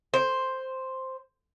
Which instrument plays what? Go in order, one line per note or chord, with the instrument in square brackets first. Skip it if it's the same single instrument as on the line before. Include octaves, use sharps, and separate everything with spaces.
[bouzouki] C5